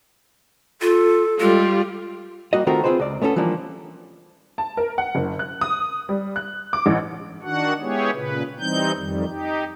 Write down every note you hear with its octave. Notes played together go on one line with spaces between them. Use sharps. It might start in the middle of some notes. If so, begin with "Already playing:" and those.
F4 A4
G3 G#3 F4
G3 A#3 F#4 D#5
D#3 A3 C4 F4 F#4 A#4
C4 F4 G#4 B4 C5
C#2 D5
A3 B3 C#4 E4 A4
E3 F3 G3 A#3 D4
A5
A#4
F#5
F#1
F#6
D#6
G3
F#6
D6
A1
D#3 D4 F#4 F#5
G#3 B3 E4 G4 G#4 C#5
A#2 C#3 B4
E3 G3 C4 D#4 G6
F2 D#3 G3
D#4 G4